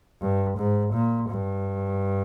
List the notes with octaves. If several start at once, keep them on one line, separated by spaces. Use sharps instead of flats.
G2
G#2
A#2
G2